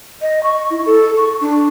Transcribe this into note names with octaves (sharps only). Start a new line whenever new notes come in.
D#5
C#6
E4
A4
C#6
D4